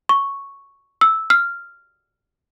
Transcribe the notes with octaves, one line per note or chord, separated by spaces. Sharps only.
C#6
E6
F6